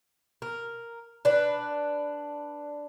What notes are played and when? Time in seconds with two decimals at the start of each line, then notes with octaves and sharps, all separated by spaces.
0.42 A#4
1.25 D4 B4